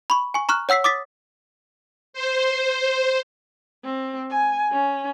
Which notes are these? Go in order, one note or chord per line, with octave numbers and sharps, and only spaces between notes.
B5 C#6
G#5 C#6
A#5 C#6 F6 F#6
C#5 F#5 E6 B6 C7
D6 D#6 A6 B6
C5
C4
G#5
C#4